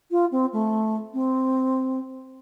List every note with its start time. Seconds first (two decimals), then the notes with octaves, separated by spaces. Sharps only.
0.11 F4
0.31 C4
0.52 A3
1.13 C4